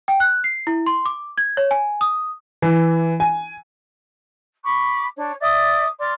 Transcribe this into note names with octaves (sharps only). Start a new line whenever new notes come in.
G5
F#6
C7
E4
C6
D6
G#6
C#5
G#5
D#6
E3
G#5
B5 C#6 D6
D4 C#5
D5 E5 D6 D#6
D5 C6 D6 F6